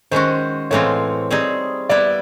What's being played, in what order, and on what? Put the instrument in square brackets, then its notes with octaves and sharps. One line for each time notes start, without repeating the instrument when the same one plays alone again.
[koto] D#3 G#3 C#4 F#4 [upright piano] C5
[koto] A2 E3 G#3 C4 F4 [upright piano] C#5
[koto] G3 C4 D#4 G#4
[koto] G3 B3 E4 [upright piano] D5